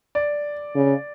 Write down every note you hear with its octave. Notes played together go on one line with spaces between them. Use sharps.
D5
C#3